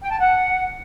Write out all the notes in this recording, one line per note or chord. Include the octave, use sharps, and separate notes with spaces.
G5
A5
F#5